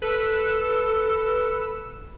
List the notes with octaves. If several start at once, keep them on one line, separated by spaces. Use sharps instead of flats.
A4 B4 E6